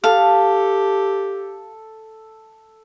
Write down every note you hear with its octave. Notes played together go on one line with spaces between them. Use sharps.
G4 A4 F5